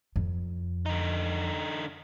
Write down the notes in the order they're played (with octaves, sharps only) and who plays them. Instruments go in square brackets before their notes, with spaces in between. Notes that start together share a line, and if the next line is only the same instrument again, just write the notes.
[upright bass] F2
[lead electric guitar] D3 D#4